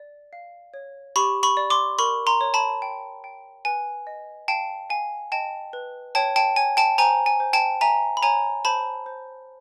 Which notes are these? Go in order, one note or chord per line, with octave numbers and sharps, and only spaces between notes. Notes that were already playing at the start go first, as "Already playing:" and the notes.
Already playing: D5
F5
C#5
G4 B5 C#6
B5 C#6
D5
C6 D6
A#4 B5 C#6
A#5 C6
C#5
A5 B5
G5
G5
B4 G#5
D#5
F5 G5 A5
F5 G#5
D#5 G5 A5
B4
C#5 G5 A5
G5 A5
C#5 G#5
G5 A5
C5 G#5 A#5
G#5
C5
G5 A5
E5 G#5 A#5
B5
C#5 G#5 A#5
C5 A5 B5
C5